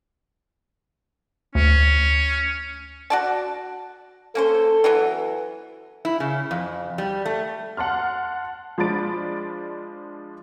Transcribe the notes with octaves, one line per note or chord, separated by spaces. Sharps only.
D2 C#4
F#4 D5 A5
A#3 C#4 A4 C5
E3 F#3 B3
E4
C#3
F2
G3
A3
F#5 A5 C6 F6
F3 G#3 D4 B5 A6 D7